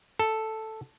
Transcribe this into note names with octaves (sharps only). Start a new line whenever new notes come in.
A4